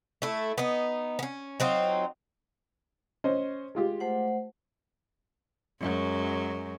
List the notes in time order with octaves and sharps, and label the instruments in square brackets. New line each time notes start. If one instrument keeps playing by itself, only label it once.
[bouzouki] A3 E4
B3 D#4
B3 C#4
F#3 C4 D#4 F4
[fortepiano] C#4 C5 D#5
G#3 F4 G4
[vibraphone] A3 C5 F#5
[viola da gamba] F#2 F#3 G#3